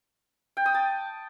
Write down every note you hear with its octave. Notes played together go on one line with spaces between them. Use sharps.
G5
D#6
A5